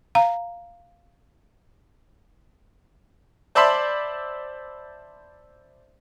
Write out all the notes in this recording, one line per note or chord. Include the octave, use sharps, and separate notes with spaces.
F5 A#5
C5 D5 E5 A5 B5 C6